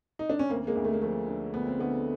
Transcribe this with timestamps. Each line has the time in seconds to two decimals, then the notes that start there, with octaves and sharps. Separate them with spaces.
0.19 D#4
0.30 D4
0.39 C#4
0.49 D2 A#3 C4
0.67 G#3 A#3
0.76 D2
0.84 A3
0.94 A#3
1.02 F3 A3
1.28 D3
1.54 D2 B3
1.67 C4
1.79 D3 A3 B3